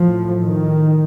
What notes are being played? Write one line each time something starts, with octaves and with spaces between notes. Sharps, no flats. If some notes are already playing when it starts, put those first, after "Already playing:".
Already playing: A2 F3
D#3